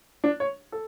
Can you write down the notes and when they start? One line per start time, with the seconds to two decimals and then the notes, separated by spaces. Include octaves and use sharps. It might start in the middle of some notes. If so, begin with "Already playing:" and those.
0.24 D4
0.40 C#5
0.72 A4